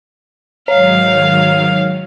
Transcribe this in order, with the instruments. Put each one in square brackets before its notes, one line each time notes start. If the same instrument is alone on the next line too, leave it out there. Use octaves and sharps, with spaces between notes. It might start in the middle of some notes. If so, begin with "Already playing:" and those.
[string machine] G#2 D#3 F#3 [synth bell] C#5 [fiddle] F5